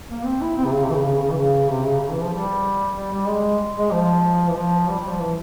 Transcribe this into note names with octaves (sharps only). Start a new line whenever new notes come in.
A#3
C4
E4
C4
C3
C#3
C3
E3
C#3
C#3
C#3
E3
C#3
C3
C#3
C#3
E3
F3
G3
G3
G3
G#3
G#3
F3
E3
F3
G3
G3
F3
E3